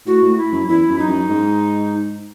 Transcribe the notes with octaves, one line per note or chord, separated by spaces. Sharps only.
A2 F#4
A2
E4
F#2
E2 E4
F#2
D#4
F#2
G#2